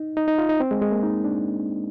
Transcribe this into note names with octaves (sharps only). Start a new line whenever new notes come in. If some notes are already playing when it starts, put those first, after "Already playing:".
Already playing: D#4
D#4
D#4
F4
D#4
C4
G#3
G#3
A#3
D#4
D4